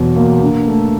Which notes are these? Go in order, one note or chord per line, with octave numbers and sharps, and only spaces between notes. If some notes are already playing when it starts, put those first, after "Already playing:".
Already playing: E2 B2 F#3
A#3
D3
A3